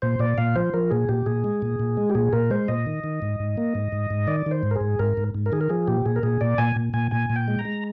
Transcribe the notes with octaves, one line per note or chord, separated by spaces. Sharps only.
A#2 C5
A#2 D5
A#2 F5
F3 C5
F3 A#4
A#2 G#4
A#2 G4
A#2 G#4
G#3
A#2
A#2
G#3
G4
A#2 G#4
A#2 A#4
G#3 C5
A#2 D#5
D#3
D#3
G#2
G#2
A#3
G#2
G#2
G#2
D#3 D5
D#3 C5
G#2
A#4
G#4
G#2
G#2 A#4
G#2
G#2
A#4
D#3 G#4
A#4
F3 G#4
A#2 G4
A#2 G#4
A#4
A#2 G#4
A#2 D5
A#2 G#5
A#2
A#2 G#5
A#2 G#5
A#2
G5
G#3
A#5
G#3